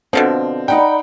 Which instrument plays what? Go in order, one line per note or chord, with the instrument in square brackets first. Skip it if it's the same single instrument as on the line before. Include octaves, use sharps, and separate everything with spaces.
[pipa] B2 D3 F3 [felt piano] C4
[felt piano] D#4 F#5 G5 [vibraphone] D5 A#5 B5